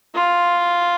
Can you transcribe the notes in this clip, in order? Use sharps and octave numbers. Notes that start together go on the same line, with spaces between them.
F4